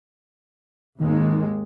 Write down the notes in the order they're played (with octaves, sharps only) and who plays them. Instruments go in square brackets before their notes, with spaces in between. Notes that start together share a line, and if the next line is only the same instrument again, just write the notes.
[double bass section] G#1 D#2 G#3 [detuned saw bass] D#3